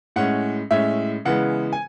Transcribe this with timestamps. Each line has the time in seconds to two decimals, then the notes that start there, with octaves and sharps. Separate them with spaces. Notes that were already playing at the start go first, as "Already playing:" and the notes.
0.16 A2 G#3 C#4 F#5
0.71 A2 G#3 C#4 E5
1.25 C#3 E3 G#3 B3 F#5
1.73 G#5